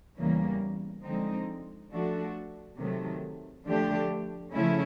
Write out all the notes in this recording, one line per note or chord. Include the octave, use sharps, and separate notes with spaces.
E2 C#3 E3 G3 A#3
D3 F3 G#3 C4 D#4
F3 A3 D4 F#4 A4
C3 D#3 F#3 A3
D3 F3 A3 D4 G4
C#3 F3 A3 C#4 E4